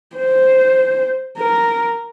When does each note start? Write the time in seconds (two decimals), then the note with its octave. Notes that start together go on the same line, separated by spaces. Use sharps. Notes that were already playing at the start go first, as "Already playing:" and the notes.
0.17 C5
1.38 A#4